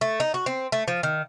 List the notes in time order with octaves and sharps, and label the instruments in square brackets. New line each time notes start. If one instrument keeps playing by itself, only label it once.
[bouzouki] A3
D#4
F#4
C4
A3
F3
D#3